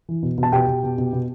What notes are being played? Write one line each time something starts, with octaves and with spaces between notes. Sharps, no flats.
E3
B2
B2
A5
B2 G4 G5
B2
B2
B2
B2